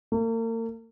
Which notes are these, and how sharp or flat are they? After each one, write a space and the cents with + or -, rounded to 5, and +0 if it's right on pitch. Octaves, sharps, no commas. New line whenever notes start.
A#3 -40